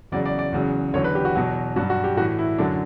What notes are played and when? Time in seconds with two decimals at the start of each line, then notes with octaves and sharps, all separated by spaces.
0.12 E2 C#3 F#3 D5
0.26 D5
0.39 D5
0.53 E2 C#3 F#3
0.94 E2 D3 F#3 C#5
1.04 B4
1.15 G4
1.25 F#4
1.35 E2 B2 F#3
1.76 G2 F#3 F#4
1.90 F#4
2.04 G4
2.17 A2 F#4
2.20 E3
2.38 E4
2.58 F#2 D3 F#3 D4